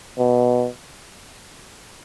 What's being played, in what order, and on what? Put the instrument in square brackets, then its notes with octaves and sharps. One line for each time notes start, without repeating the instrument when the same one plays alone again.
[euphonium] B2